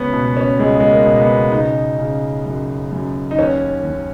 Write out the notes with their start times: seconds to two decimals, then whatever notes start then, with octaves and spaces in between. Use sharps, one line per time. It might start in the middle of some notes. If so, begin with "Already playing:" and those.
Already playing: C#2 B3 C#4
0.13 B2
0.37 C#4
0.59 C#2 G#3
0.80 G#3
0.91 A#3
1.06 B2
1.21 B3
1.52 C#3 D#4
1.99 C#3
2.46 F#2
2.92 F#2
3.31 D#4
3.38 D#2 C#4
3.84 D#2